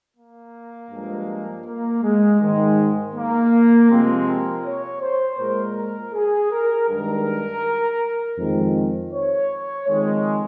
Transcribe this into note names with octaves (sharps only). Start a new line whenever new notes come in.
A#3
G2 F3 G#3
A#3
G#3
G#2 D#3 G#3
A#3
C3 F3 G#3 C4
A#4
C#5
C5
A#2 G#3 A#4
A#4
G#4
A#4
G2 D#3 G#3 A#4
F2 D#3 G#3 C5
C#5
F2 D#3 G#3